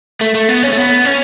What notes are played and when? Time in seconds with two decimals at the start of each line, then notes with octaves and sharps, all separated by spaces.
0.21 A3
0.35 A3
0.49 B3
0.63 C#4
0.72 A3
0.77 B3
1.05 C#4